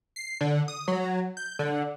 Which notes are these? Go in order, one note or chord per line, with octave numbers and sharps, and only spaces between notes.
C7
D3
D#6
F#3
G6
D3